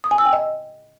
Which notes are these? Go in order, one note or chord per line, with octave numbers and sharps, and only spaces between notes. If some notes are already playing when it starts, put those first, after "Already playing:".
D#6
G#5
E6
G5
D#5